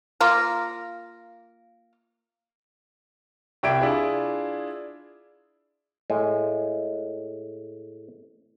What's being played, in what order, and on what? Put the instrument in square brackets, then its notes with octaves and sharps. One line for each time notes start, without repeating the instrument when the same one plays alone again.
[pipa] A#3 F4 A#4
[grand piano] C2 G4 D5 E5 G#6 D7
D4 E4 F4 G#4
[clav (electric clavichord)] A2 G#3